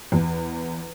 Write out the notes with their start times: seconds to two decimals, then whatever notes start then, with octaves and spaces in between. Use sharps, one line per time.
0.12 E2